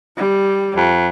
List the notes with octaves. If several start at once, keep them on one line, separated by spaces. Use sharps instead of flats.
G3
F2